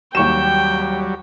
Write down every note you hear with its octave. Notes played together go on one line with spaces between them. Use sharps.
D#2 F#3 G3 G5 C#6 E7